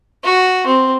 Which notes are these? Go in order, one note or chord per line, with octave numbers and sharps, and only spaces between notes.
F#4
C4